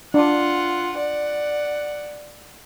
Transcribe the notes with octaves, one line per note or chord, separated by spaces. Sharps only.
D4 F4 F#5
D5 F#5